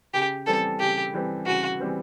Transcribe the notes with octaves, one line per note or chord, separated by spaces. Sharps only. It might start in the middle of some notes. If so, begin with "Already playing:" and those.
C#3 G4
E3 G3 C4 A4
C#3 G4
E3 G3 C4
C#3 F#4
E3 G3 C4